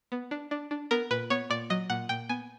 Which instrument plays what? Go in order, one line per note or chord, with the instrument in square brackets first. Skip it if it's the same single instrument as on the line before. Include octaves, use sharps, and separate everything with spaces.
[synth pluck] B3
D4
D4
D4
B3 A#4
A#2 B4
B3 C#5
A#2 D5
F#3 D#5
A#2 F#5
A#2 G5
B3 G#5